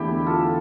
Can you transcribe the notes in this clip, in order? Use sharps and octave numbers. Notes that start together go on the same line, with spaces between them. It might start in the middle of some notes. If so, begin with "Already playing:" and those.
Already playing: E2 D3 A3 E4 G4
F4 A4